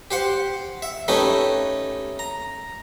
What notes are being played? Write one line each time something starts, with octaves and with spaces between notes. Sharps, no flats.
G4 C5 F#5
E5
A3 C#4 D#4 G4 B4
A#5